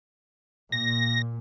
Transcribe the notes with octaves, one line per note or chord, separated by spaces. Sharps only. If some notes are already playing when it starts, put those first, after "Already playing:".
A#2 A#6